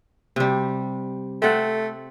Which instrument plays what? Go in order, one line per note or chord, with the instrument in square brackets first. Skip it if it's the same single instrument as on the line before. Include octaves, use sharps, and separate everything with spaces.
[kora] C3 G3
[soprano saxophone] A3 [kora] C4 F#5